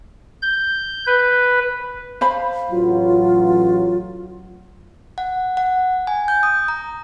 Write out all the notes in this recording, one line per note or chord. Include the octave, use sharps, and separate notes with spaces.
G6
B4
C5 F5 B5
A1 F#3 F4
F#5
F#5
G#5
G6
D#6
A#5